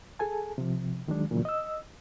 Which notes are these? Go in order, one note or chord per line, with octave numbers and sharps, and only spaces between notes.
G#4 A4 G#5 A5
C3 F3
D#2 D#3 F#3 G#3 D4
E2 A#2 C#3 E3 F#3
D#5 E6